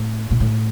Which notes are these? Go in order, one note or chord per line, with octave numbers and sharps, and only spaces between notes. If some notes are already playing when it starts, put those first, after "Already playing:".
Already playing: A2
A#2
A2